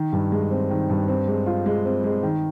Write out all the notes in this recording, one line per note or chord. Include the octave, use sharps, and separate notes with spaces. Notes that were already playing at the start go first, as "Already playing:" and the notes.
Already playing: D#3
G2
G#3
C4
D#3
G2
C4
G#3
F4
G#3
C4
G#3
D#3